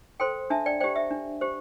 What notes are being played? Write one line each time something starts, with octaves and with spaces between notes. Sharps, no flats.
A4 C5 G5 C6
D4 E5 A5
D5 G5
G4 C5 D5 G5
E5
D4
G4 C5